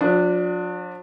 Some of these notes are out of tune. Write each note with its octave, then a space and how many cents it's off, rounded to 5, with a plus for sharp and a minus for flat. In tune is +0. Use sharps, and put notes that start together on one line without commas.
F3 +45 D4 +0